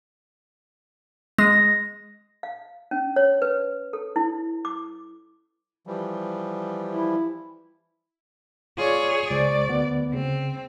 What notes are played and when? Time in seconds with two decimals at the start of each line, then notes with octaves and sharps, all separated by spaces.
1.38 G#3 A#6
2.43 F5
2.91 C#4
3.16 C#5
3.42 B4
3.93 A4
4.16 E4
4.65 D6
5.87 E3 F3 G3
6.91 E4
8.78 F4 G#4 C#5 D5
9.30 C#2 C5 D5 C#6
9.69 D2 B3
10.14 C#3 C4